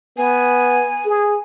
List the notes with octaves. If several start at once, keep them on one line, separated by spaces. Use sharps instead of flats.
B3 G#5
G#4